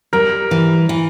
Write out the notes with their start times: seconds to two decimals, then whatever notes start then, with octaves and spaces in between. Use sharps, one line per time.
0.13 G3 A#4
0.51 E3
0.89 E3